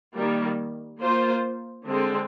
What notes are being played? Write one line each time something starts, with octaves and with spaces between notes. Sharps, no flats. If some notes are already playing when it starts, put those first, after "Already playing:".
D#3 G3 A#3
A#3 F4 C5
D3 G#3 C4